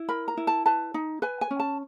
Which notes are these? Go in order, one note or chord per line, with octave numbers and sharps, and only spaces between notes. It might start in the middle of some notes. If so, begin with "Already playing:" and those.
Already playing: E4
A#4 B5
A#5
E4
A5
B4 A5
D#4
B4 G#5
G#5
C#4
A5